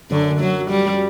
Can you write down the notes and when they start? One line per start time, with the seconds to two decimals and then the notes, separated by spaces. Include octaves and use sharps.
0.10 F#2 D3
0.40 F#3
0.71 G3